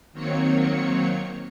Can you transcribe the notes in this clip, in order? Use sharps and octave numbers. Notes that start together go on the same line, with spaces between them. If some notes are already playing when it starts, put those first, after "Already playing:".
D#3 F#3 A#3 C4 C#5 C#7